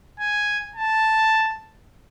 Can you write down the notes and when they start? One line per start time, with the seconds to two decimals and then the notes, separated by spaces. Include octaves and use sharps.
0.20 G#5
0.76 A5